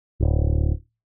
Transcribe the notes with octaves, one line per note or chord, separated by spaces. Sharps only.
D1